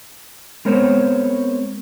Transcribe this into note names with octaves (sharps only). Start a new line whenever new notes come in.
G#3 B3 C4 A#4 C5 C#5